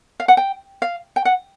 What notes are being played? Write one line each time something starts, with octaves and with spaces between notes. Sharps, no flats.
F5
F#5
G5
F5
G5
F#5